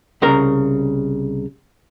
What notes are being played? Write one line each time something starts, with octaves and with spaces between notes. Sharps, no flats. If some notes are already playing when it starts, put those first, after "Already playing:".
C2 C#3 A#4 A#5